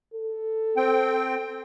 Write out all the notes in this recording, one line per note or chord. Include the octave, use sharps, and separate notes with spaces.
A4
C4 G5